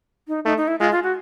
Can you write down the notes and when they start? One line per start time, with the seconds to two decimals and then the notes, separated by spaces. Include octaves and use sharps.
0.28 D#4
0.45 A3 D#4
0.57 D#4
0.68 E4
0.80 G#3 F4
0.92 F4
1.03 F#4